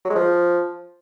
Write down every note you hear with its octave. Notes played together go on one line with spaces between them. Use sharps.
F#3
G#3
F3